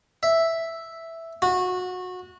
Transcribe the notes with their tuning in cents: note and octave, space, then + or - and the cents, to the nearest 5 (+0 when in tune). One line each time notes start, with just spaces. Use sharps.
E5 +0
F#4 -20